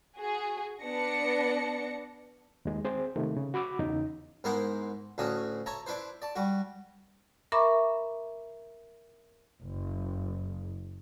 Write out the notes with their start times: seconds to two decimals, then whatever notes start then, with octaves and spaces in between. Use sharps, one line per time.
0.17 F#4 G#4
0.81 B3 D4 A5 A#6 C#7
2.65 D#2 G#3
2.85 C4 G#4 C5
3.16 C3 D#3 A3
3.37 C#3
3.54 F#4 B5 D6 E6
3.79 E2 C#3 D#4
4.44 G#2 B3 E4 A#4 C5 F#5
5.18 D2 A2 C#4 F#4 D#6
5.66 C#5 E5 A5 A#5
5.86 D4 E4 B4 C5
6.22 D5 A5
6.36 G3 F#4
7.52 A#4 E5 A#5 B5 C#6 D6
9.63 F#1